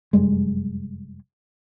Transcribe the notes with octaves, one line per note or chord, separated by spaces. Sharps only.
F1 F#2 G3 G#3